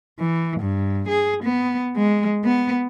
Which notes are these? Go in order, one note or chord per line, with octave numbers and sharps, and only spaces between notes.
E3
G2
G#4
B3
G#3
B3